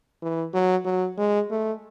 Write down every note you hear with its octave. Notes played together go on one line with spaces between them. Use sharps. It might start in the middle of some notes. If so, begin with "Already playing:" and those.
E3
F#3
F#3
G#3
A3